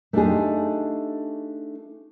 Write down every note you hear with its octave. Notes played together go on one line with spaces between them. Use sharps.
A3 D4 D#4 F4 G4 G#4